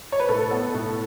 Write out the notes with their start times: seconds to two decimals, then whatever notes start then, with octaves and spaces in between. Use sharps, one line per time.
0.12 C#5
0.20 B4
0.29 A2 A4
0.51 B3
0.74 A2